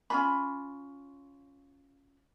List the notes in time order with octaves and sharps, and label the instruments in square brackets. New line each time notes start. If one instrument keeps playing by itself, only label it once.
[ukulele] C#4 F4 B5